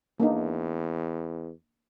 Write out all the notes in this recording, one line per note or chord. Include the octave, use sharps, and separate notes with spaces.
E2 A#3 D4 D#4